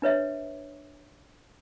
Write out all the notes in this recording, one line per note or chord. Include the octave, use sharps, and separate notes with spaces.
D4 B4 C#5 E5